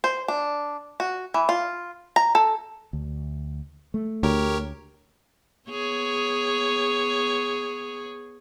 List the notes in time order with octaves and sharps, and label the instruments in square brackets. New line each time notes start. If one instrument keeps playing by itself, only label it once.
[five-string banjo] C5
D4
F#4
E3
F4
A#5
A4
[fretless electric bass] D2
A3
[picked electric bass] D2 [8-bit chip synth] G4 A#4 C#5
[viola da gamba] B3 G#4 C#5